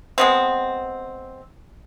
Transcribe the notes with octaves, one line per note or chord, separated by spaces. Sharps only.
G#3 B3 C4